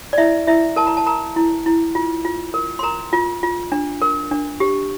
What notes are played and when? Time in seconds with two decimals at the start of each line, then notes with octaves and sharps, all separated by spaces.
0.13 D5
0.18 E4 E5
0.47 E4 E5
0.76 A#4 A5
0.87 A#5
0.97 A5
1.06 A#4 A#5
1.36 E4
1.66 E4
1.95 F4
2.25 F4
2.54 A#4
2.79 C6
2.83 A#4 A#5
3.13 F4
3.43 F4
3.72 D4
4.02 A#4
4.31 D4
4.60 G4